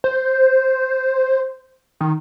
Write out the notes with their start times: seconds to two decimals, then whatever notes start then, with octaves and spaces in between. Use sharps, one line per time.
0.04 C5
2.01 D#3